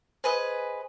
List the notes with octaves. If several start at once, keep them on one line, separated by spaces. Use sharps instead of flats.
G#4 B4 C5 D#5